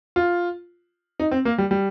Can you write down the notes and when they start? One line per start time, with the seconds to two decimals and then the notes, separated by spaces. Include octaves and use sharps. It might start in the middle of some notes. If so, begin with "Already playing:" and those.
0.16 F4
1.20 D#4
1.31 C4
1.45 A#3
1.58 G3
1.71 G3